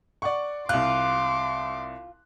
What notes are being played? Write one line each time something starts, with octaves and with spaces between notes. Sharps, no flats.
D5 F#5 C#6
C2 F4 C6 D6 F#6